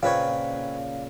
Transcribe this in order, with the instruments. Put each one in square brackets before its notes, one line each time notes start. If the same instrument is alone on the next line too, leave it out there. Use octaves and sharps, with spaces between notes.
[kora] A#2 C#3 [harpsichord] C4 B4 C#5 [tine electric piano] F5